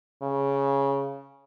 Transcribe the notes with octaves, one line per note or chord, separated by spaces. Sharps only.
C#3